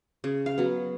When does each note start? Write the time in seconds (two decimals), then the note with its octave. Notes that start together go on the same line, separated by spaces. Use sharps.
0.24 C#3
0.46 F5
0.58 F#3 B3